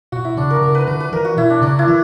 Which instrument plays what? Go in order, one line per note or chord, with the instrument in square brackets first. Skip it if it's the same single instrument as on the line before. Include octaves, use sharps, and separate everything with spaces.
[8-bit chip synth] B2 [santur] F#4
[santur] E4
[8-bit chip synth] C#3 [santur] D4
[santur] A#4
[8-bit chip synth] C#3 [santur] A#4
[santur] B4
[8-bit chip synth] D3 [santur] B4
[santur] B4
[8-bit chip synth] E3 [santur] A#4
[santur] F#4
[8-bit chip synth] B2 [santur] E4
[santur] D4
[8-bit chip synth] C#3 [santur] D4
[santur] E4
[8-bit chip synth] E3